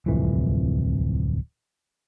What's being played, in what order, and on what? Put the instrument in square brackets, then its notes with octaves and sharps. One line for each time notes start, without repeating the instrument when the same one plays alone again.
[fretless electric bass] D1 C2 F2 E3